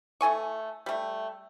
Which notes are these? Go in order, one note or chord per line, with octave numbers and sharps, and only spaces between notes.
A3 A4 G#5 C#6
G3 A3